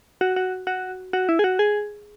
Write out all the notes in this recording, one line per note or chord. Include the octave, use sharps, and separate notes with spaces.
F#4
F#4
F#4
F#4
E4
G#4
F#4
G#4